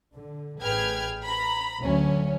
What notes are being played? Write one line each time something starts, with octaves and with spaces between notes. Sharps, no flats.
D3
A1 G#4 B4 G5 F6 G#6
A#5 B5
D2 F#3 C#4